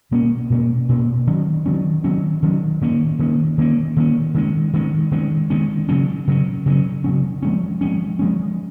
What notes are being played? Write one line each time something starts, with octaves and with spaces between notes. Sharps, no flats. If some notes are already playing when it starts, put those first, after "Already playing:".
B2 A#3 C#4
B2 A#3 C#4
B2 A#3 C#4
D#3 F#3 C#4
D#3 F#3 C#4
D#3 F#3 C#4
D#3 F#3 C#4
D#3 A#3 C#4
D#3 A#3 C#4
D#3 A#3 C#4
D#3 A#3 C#4
D#3 G#3 C#4
D#3 G#3 C#4
D#3 G#3 C#4
D#3 G#3 C#4
C#3 F#3 C#4
C#3 F#3 C#4
C#3 F#3 C#4
C#3 F#3 C#4
F3 G#3 C#4
F3 G#3 C#4
F3 G#3 C#4